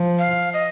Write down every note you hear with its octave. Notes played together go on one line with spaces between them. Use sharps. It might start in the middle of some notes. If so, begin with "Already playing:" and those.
Already playing: F3
F5
D#5